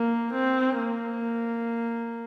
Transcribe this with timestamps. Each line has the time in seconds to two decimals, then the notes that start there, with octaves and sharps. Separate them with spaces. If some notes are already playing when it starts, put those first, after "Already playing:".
Already playing: A#3
0.33 C4
0.78 A#3